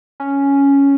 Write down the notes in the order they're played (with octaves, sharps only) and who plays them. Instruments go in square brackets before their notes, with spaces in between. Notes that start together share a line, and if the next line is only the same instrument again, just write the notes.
[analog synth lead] C#4